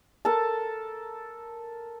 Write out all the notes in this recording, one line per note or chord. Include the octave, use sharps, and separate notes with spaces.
A4 A#4 A5